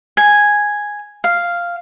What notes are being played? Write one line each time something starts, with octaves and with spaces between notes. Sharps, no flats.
G#5
F5